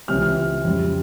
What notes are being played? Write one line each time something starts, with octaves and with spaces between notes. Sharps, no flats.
C#2 C3 E3 G3 C#4 F6
F2 C#3 G3